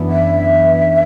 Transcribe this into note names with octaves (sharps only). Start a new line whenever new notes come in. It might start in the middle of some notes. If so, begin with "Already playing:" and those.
Already playing: F#2 E3 B3 D4
E5